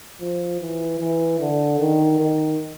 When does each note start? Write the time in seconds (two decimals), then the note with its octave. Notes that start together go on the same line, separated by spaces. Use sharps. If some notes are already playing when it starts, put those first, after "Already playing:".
0.21 F3
0.61 E3
1.00 E3
1.40 D3
1.79 D#3
2.20 D#3